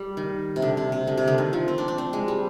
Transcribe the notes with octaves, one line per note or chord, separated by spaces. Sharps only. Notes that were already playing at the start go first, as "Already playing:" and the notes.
Already playing: G3
D#3
C3
D3
C3
C3
D3
C3
D3
D#3
F3
C4
D4
D4
C4
G#3
G3